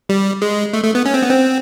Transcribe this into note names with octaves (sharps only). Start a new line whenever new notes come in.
G3
G#3
A3
A3
B3
C#4
C4
B3
C4